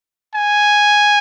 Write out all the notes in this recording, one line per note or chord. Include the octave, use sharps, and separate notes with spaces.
G#5